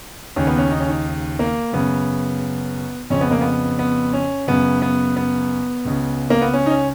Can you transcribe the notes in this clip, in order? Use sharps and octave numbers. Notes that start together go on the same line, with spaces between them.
D#2 C#3 C#4
B3
C#4
D#4
C#4
D#4
A#3
F#2 C#3 B3
F2 C#3 C#4
B3
A#3
B3
B3
C#4
F#2 C#3 B3
B3
B3
C#2 C#3
A#3
B3
C#4
D#4
C#4